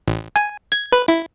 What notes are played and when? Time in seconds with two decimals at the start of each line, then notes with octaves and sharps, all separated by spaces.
0.08 A1
0.36 G#5
0.72 G#6
0.92 B4
1.08 E4